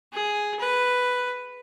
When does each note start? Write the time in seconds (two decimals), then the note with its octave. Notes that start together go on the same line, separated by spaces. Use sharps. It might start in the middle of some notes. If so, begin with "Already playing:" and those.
0.14 G#4
0.60 B4